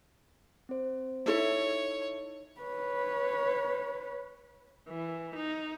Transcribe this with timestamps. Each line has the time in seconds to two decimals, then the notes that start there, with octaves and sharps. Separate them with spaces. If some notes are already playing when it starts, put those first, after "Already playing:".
0.69 C4 C5
1.26 D#4 E4 A4 C#5 E5
2.61 B4 C#5
4.89 E3
5.36 D#4